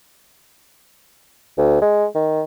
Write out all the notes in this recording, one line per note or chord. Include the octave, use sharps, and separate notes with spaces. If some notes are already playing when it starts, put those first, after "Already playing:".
D2
G#3
D#3